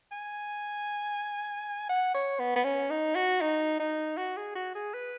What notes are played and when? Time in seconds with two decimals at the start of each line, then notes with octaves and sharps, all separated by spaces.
0.12 G#5
1.89 F#5
2.14 C#5
2.40 B3
2.56 B3
2.65 C#4
2.90 D#4
3.15 F#4
3.41 D#4
3.79 D#4
4.17 F#4
4.37 G#4
4.55 F#4
4.75 G#4
4.94 B4